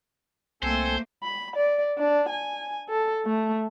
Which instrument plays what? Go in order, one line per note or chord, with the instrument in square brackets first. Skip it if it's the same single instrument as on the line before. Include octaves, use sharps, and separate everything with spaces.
[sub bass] C2 [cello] A3 A#3 [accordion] C4 A4 G#5 [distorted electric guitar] C5
[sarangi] B5
D5
D4
G#5
A4
A3